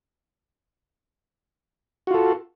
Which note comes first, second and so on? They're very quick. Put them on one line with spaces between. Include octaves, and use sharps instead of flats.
F#4 F4 A4